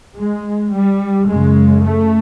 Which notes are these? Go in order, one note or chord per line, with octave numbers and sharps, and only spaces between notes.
G#3
G3
F#2 C#3 G#3
A3